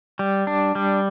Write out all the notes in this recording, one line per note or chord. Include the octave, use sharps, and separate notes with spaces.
G3
D4
G3